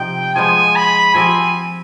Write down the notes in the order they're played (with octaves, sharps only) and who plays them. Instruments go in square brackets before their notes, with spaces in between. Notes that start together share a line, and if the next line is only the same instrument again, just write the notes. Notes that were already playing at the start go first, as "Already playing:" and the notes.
Already playing: [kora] C3 F3 D#4 [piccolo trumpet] G5
[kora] F3 G#3 B3 [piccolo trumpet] G#5
[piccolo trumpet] B5
[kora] F3 C4 G4 [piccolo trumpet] G#5